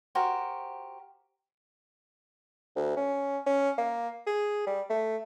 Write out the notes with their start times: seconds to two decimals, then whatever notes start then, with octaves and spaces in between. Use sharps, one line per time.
0.15 F#4 G4 A#4 C5
2.76 D2
2.97 C#4
3.46 C#4
3.78 A#3
4.27 G#4
4.67 G3
4.90 A3